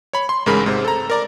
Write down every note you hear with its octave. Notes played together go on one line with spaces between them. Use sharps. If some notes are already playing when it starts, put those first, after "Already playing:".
C#5 B5
C6
A1 G#2 C#3 G#3 A#4 B5
G#2 C3 C5
A4 A#5
A#4 D5 A#5